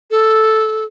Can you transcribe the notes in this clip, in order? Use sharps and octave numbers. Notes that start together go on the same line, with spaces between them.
A4